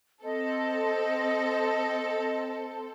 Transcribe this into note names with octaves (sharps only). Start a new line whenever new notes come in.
C4 A4 D#5